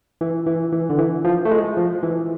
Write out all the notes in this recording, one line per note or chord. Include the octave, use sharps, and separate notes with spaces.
E3
E3
E3
D3
E3
F3
A3
G#3
F3
E3